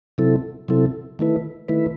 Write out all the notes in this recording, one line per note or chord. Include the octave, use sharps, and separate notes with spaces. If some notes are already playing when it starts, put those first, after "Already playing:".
C3 F#3 C4 E4 A4
C3 F#3 C4 E4 A4
D#3 A3 E4 B4
D#3 A3 E4 B4